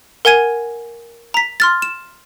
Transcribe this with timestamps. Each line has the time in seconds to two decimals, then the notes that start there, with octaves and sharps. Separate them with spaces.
0.25 A#4 F#5 G#5 G#6 D#7
1.34 A#5 B6
1.60 C6 F6 A6
1.82 E7